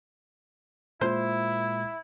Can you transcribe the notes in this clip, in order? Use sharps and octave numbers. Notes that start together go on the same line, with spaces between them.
A#2 G#3 E4 F4 C5